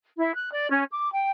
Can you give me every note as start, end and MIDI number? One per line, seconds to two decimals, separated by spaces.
0.18 0.33 64
0.34 0.49 90
0.52 0.68 74
0.70 0.83 61
0.91 1.09 86
1.12 1.30 79